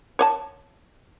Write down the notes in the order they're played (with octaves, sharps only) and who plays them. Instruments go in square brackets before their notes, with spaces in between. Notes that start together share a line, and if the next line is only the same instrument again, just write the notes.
[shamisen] C#5 D5 A5